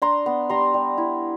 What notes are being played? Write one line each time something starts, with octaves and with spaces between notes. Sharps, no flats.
D4 A#5 C6
B3
G3 A#5 C6
G3
E4